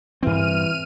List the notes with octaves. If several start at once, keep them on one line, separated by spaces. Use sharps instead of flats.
G2 E3 C4 F6 D#7